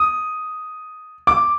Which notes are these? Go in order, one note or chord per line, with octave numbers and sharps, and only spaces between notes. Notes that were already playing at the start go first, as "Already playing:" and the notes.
Already playing: D#6
D6